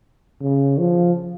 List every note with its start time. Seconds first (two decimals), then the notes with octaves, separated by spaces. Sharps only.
0.42 C#3
0.78 F3